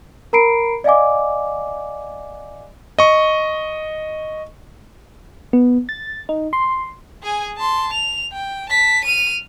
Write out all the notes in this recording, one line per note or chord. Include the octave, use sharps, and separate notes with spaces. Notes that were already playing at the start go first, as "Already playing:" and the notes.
A#4 A#5 B5 C7 D7
D5 D#5 F5 G#5 D6
D#5 C#6
B3
A6
D#4
C6
G#4 G#5
A5 C6
F7
G5
A5 B6
F6 D#7